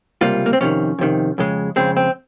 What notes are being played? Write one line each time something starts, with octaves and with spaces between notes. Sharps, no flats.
C#2 C3 G3 A#3 F4
A#3
C4
F2 C3 D#3 C#4
F2 C3 D#3
F2 C#3 G#3
F2 C#3 G#3 C4
C4